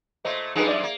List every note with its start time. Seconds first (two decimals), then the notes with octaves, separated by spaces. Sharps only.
0.25 A#2 A3 C5 D#5
0.56 F#2 F3 G#3 D#4 G#4 B4
0.68 D5 E5
0.83 A#3